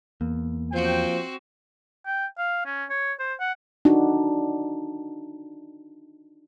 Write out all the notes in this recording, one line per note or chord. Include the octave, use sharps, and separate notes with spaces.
E2 A#3
F3 C4 F#4 G5
G5
F5
C#4
C#5
C5
F#5
D4 D#4 F#4